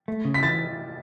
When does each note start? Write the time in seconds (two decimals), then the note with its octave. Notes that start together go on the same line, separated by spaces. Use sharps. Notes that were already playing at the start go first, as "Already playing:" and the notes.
0.08 A3
0.25 C#3
0.34 B6
0.43 E3 A6